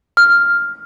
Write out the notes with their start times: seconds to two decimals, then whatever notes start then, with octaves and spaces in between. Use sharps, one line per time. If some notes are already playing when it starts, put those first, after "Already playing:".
0.17 F6